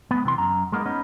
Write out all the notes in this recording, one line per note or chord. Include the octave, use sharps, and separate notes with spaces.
G#3 B3
C3 E3 C6
F#2 A#5
G#3 A#3 B3 D#4
B3 C#4 D#4